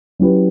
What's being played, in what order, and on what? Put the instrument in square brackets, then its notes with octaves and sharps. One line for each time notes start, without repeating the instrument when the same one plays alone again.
[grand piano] F#3 C#4 E4 G4 B4